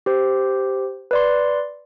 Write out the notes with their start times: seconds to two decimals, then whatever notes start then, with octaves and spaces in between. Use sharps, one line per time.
0.06 G4 C5
1.11 B4 D5 C6